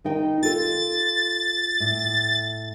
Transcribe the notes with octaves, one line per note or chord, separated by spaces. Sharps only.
D#3 D#4 G5
F4 A4 A6
A2